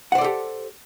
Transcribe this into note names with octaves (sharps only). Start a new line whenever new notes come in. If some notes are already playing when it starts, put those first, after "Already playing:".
G4 A4 C5 D5 F#5